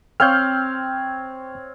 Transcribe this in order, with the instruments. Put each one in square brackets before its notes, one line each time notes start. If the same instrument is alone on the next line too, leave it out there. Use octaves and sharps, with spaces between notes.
[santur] C4 C#5 F5 [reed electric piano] F6 G6